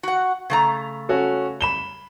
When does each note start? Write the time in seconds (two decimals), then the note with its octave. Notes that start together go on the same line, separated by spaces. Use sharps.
0.03 F#4 F#5
0.50 C#3 A3 A#5
1.09 C#4 F#4 A4
1.61 B5 E7 G7